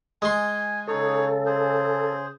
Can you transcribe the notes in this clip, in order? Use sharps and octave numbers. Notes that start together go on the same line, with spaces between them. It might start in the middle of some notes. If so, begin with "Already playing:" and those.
G#3 G#5 C6
C#3 D#4 G#4 A4 C#5
G#4 C5